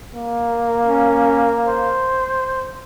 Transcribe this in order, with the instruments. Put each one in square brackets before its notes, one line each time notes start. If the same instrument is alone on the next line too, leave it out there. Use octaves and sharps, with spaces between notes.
[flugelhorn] A#3
[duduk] C#4
C5